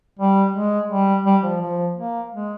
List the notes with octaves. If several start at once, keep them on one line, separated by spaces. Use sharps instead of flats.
G3
G#3
G3
G3
F3
F3
A#3
G#3